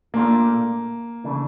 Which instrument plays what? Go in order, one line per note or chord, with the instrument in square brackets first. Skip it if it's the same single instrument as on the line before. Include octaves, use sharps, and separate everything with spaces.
[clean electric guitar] A#2 A3 D4 F4 [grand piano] A#3
[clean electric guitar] C#3 E3 A3 D4